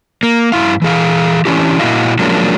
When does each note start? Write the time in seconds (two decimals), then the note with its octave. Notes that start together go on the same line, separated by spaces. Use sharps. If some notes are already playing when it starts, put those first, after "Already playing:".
0.23 A#3
0.52 G2 E4 F5
0.82 E3 G#4 F5
1.45 E3 C#4 D4 E4 G4
1.79 A#2 A#3 E4 F#4 D#5 F5
2.19 F3 F#3 G#3 A#3 C#4 D4